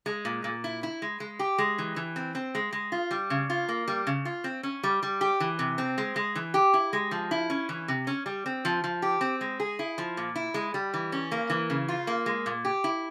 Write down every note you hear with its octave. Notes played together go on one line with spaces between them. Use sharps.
G#3
A#2
A#2
E4
E4
G#3
G#3
G4
G#3
E3
E3
C4
C4
G#3
G#3
F4
G3
C#3
F4
A#3
G3
C#3
F4
C4
C#4
G3
G3
G4
E3
C3
C4
G#3
G#3
E3
G4
E4
G#3
F3
E4
C#4
E3
C3
C#4
G3
C4
F3
F3
G4
C4
G#3
G#4
E4
F3
A#2
E4
G#3
G3
E3
C#4
A#3
E3
C#3
F4
A#3
G#3
A#2
G4
E4